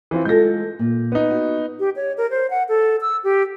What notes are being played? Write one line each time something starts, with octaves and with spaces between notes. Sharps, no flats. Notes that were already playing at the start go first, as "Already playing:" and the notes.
E3 C4 F4
G#3 F4 A4 G6 A#6
A#2
B3 D#4
F#4
G4
C#5
A#4
C5
F#5
A4
E6
G4